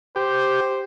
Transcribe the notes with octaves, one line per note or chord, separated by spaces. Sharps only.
G4 C5